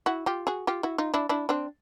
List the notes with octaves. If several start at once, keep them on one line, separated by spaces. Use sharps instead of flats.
E4 F#4
F4 G4
F#4 G#4
F4 G4
E4 F#4
D#4 F4
D4 E4
D4 E4
C4 D4